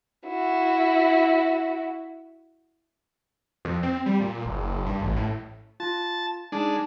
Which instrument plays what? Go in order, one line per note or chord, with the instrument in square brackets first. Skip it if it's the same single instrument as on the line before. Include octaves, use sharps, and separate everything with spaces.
[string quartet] E4 F#4
[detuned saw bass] F2
C4
G3
A#2
F#1
G2
A1
A2
[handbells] F4 [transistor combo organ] A5
[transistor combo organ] G#3 D4 [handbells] D#4 A5